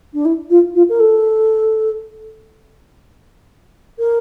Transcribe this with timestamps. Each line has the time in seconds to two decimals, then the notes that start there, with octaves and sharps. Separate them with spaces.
0.13 D4
0.25 E4
0.50 F4
0.75 F4
0.89 A#4
0.99 A4
3.99 A#4